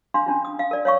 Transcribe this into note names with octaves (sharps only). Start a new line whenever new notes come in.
D4 F5 C6
C#4 D4 F4
D#6
F5
A#4 D5
C#5 F5 C#6